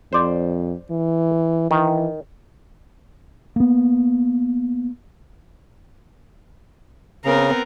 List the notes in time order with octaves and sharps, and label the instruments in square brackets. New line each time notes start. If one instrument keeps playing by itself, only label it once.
[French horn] F2 [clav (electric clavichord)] C5 D5
[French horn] E3
[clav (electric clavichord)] D#3 [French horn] E3
[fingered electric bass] A#3 B3
[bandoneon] C#3 [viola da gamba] B3 C4 A#4